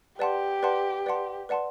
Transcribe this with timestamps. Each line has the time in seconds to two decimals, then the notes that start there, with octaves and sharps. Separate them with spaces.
0.19 G4 B4 D5 F#5 A5 C6
0.62 B4 D5 F#5 A5 C6
1.06 B4 D5 F#5 A5 C6
1.49 B4 D5 F#5 A5 C6